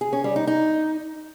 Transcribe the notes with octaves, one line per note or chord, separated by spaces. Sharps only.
G#4
C#4
G3
D#4
D#4